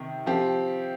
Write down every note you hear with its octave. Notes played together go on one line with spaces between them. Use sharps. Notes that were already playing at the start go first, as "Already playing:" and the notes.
Already playing: C3 D#3 D#4
F3 C4 G4